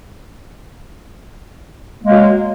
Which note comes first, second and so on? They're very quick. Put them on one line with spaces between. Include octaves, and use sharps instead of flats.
A#3 G#3 F#3